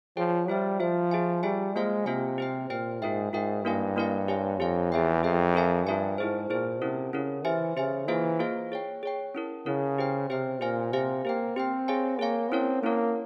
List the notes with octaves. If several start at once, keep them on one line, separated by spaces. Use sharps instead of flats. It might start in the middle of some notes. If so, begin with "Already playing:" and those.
F3 G#4 C#5 G5
G3 F4 C5 E5
F3 F4 C5 E5
F4 G#4 E5 G#5
G3 F4 G#4 E5 G#5
G#3 A#3 F4 C5 F5 G#5
C3 A#3 F4 C5 F5 G#5
G4 C5 G5
A#2 G4 C5 G5
G#2 F4 A#4 E5 G5
G#2 F4 A#4 E5 G5
G2 A#3 E4 A#4 F5 G#5
A#3 E4 A#4 F5 G#5
G4 C#5 F5 G#5
F2 G4 C#5 F5 G#5
E2 G#4 E5 G5
F2 G#4 E5 G5
F4 A#4 E5 G#5
G2 F4 A#4 E5 G#5
G#2 E4 G#4 C5
A#2 E4 G#4 C5
C3 C#4 E4 A#4
C#3 C#4 E4 A#4
E3 G4 C5 E5 G#5
C#3 G4 C5 E5 G#5
E3 A#3 F4 G#4 C5 F5
A#3 F4 G#4 C5 F5
G#4 C#5 G5
G#4 C#5 G5
C#4 E4 A#4
C#3 C#4 E4 A#4
G4 C5 G5
C3 G4 C5 G5
A#2 G4 C5 F5 G#5
C3 G4 C5 F5 G#5
A#3 G4 C5 G5
C4 G4 C5 G5
G#4 C#5 F5 G#5
A#3 G#4 C#5 F5 G#5
C4 C#4 E4 A#4 C#5
A#3 C#4 E4 A#4 C#5